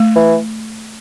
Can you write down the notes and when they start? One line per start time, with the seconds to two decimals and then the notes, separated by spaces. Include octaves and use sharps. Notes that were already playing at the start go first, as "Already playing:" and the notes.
Already playing: A3
0.15 E3